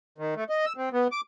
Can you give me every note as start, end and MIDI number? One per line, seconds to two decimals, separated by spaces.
0.18 0.34 51
0.36 0.44 57
0.49 0.66 75
0.66 0.73 88
0.77 0.89 60
0.93 1.08 59
1.12 1.21 86